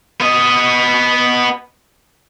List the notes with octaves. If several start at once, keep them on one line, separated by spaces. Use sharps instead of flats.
B3 D#5